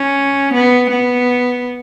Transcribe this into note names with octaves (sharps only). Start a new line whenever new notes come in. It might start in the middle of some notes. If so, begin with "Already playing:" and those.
Already playing: C#4
B3
B3